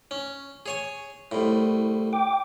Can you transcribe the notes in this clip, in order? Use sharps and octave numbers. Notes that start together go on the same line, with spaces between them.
C#4
G#4 C#5 G#5
C2 A2
G5 D6